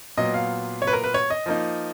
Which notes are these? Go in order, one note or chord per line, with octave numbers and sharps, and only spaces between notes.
A#2 F#3 B3 D#5
F5
C#5
B4
A#4
B4
C#5
D#5
F3 A#3 D#4